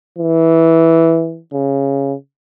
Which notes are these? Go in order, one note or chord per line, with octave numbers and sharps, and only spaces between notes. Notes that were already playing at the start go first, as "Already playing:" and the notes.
E3
C#3